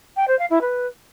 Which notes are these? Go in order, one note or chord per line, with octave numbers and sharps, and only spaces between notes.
G5
C5
F5
E4
B4